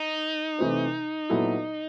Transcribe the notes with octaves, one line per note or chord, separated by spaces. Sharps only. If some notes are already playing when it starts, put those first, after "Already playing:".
Already playing: D#4
C3 E3 A3 C4
A#2 F#3 B3 E4 A4